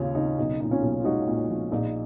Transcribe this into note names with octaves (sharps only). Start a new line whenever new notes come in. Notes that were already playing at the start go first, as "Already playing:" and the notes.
Already playing: D#2 C#3 C#4 F4
C#3 D#4
B1 D#4
A#2 D#4
C#4 F4
B1
F4
G#3 D#4 F#4
A#2
F3
A#1 D#4